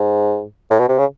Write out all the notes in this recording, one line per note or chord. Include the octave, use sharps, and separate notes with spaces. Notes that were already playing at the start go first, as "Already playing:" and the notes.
Already playing: G#2
A2
B2
C3
C#3